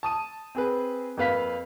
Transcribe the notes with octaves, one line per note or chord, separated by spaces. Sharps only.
A5 D#6 D#7
C4 G#4 B4
F2 A#3 B4 F5 B6